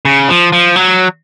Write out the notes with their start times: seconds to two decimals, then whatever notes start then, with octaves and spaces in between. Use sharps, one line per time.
0.05 C#3
0.29 F3
0.52 F3
0.76 F#3